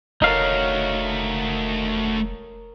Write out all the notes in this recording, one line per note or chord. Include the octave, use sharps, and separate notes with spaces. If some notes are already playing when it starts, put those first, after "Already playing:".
F1 A3 D#4 F#4 A#4 C#5 D#5 F5